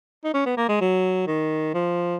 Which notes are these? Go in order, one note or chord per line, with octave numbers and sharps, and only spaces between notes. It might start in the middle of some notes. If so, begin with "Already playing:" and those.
D#4
C#4
B3
A#3
G#3
F#3
D#3
F3